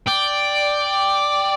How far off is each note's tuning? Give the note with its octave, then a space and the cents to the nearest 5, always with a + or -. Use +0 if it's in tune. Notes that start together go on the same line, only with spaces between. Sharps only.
D5 +0 G5 +0